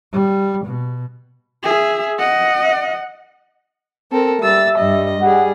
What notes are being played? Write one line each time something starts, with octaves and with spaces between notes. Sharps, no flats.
G3
B2
G#4 E5
D#5 F#5
C4 A4 A#4
G3 E5 E6 A6
G2 G3 D#5
G3 G#4 F#5